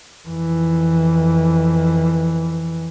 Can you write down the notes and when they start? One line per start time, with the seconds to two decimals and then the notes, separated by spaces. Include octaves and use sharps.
0.28 F2 E3